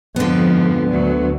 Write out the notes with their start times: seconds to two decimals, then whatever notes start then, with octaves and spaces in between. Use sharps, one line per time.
0.16 F2 G#2 D3 F3 B3
0.88 D2 F#3